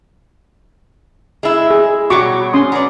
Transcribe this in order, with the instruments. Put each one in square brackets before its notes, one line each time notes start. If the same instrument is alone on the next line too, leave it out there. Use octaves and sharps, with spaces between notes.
[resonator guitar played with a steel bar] G#3 E4
[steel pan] G#4
[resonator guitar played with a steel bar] B2 F#3 G3 [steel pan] F#4 C#6 D6
[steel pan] C#4 C6 D#6
[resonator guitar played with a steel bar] F#3 B4 D5